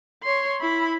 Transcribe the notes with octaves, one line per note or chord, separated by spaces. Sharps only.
C#5 C6
E4 B5